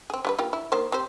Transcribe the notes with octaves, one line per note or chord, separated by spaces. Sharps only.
C4 G#4
G3 F4 B4
A#3 F4 G4
E4
D#3 A#3 C5
C4 G4 C5